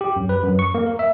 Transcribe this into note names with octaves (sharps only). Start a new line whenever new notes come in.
G4
F#2
B4
F#2
C#6
A#3
A#4
E5